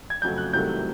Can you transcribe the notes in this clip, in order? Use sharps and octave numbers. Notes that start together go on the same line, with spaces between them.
G#6
F2 C#3 F#3 A3 G6
F#6
C2 C3 D#3 F#3 A3 G6